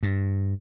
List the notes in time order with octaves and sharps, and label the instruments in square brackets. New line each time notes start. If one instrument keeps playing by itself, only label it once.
[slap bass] G2